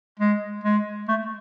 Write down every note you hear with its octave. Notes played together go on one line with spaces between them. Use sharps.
G#3
G#3
A3